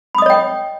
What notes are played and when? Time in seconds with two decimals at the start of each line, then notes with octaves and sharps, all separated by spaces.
0.15 B5
0.18 D#6
0.22 D#5
0.26 C#5
0.30 G5